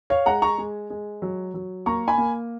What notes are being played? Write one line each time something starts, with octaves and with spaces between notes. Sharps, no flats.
C#5 F5
G#3 F#5 A#5
A#5 C#6
G#3
G#3
F#3
F#3
A#3 A#5 C#6
G#5 B5
A#3